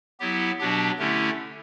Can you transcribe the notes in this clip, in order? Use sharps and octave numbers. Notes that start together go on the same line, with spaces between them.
F#3 B3 E4 G4
B2 F#3 B3 D4 G4
D3 A3 C#4 E4 G4